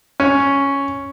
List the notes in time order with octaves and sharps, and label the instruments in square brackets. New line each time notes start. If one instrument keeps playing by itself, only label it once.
[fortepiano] C#4